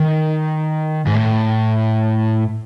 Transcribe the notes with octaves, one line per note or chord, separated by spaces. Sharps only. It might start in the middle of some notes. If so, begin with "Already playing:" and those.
Already playing: D#3
G#2
A2